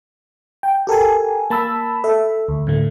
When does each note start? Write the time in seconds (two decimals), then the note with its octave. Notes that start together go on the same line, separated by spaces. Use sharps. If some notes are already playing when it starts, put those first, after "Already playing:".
0.63 G5
0.87 G4 A4 A#4 G#5
1.50 A#3 A5 B5 E6
2.04 A4 E5
2.49 D2
2.67 A2 D3 A3